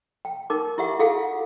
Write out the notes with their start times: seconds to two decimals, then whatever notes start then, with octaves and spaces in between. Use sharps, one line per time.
0.25 G5
0.50 D#4 A#4 D6
0.78 E4 G4 E5 F#5
0.99 E4 F#4 G#4 A4 F5 F#5